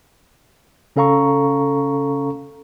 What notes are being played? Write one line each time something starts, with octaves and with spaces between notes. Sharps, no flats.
C#3 C#4 A4 F5 A#5 C#6